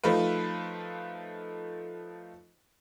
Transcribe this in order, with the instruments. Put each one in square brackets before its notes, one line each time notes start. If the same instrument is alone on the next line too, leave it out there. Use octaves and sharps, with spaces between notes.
[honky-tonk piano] F3 A3 D#4 F4 B4